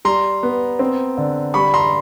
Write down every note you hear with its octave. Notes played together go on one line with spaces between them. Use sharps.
G3 A#5 C6
B3
C4
D3
G3 B5 C#6
A#5 C6